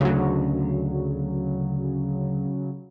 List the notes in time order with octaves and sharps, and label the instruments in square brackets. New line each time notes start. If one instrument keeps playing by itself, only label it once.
[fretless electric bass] D2 [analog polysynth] C#3 F#3